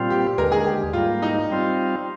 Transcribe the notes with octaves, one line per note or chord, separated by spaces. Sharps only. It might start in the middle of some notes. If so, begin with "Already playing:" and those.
Already playing: A#2 G3 C4 F4
G4
D#2 D3 G#3 A#4
G#4
G4
G#2 G3 A#3 F4
D#4
G3 C4 F4